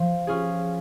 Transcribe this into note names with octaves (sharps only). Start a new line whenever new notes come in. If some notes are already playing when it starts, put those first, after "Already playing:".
Already playing: F3
C#4 F4 G#4